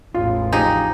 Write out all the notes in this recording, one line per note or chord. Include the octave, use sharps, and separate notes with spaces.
A1 E2 F4
F3 D#4 G4 G#4